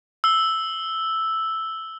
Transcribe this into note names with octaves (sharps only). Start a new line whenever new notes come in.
E6 G7